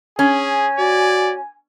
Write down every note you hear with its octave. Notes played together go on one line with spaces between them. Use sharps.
C#4 G#4 G#5
F#4 D5